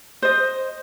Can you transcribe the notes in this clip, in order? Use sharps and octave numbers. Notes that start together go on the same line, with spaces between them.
C5 D#5